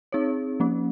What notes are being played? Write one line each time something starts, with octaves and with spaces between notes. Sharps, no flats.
C4 D#4 G#4 C#5
F3 A#3 C#4